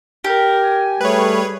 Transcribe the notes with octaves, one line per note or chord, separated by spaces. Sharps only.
G4 A#4
G#5
G3 A3 G#4 B4 C#5